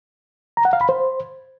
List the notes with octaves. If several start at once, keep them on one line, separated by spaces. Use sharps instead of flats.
A#5
F#5
F5
B5
C5